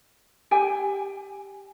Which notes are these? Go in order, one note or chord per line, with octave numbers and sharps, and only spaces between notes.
G4 G5 G#5